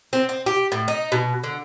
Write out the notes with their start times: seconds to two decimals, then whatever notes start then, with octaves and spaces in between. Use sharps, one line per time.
0.13 C4
0.29 C4
0.46 G4
0.72 A2
0.88 D#4
1.12 B2
1.44 D3